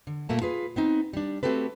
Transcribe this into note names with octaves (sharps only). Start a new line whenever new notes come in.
D3
A#2 A3 A#3 A5
F4 G#4 B4
B3 C4 D#4
G3 D4
A3 C4 F#4 G4 A4 B4